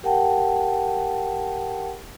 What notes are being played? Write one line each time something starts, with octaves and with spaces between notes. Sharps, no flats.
G4 A#4 F#5 G5 A5